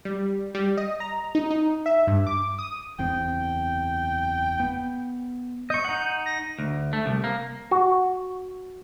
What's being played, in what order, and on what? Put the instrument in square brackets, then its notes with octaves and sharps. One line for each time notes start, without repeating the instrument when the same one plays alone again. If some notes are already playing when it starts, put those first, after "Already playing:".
[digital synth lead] G3
G3
D#5
A#5
D#4
D#4
E5
G2
D6
D#6
[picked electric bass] F#1 E2 C4 [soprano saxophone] G5
[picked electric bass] B3
[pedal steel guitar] D#5 C#6 [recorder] G6
[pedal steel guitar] D#4 F#5
[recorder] A#6
[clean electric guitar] D2
A3
C2
A#3
[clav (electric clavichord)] F#4